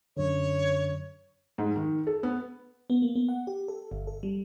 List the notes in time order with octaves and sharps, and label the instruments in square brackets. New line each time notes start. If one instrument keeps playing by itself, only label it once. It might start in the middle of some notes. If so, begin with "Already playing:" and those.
[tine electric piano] F#2 D3 [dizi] C#5
[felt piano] G#2
D#3
A4
B3
[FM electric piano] B3
A#3
B3
F#5
G4
A4
G1
A4
G3